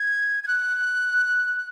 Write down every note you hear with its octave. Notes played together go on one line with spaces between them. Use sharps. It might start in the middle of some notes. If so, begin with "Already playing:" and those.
Already playing: G#6
G#6
F#6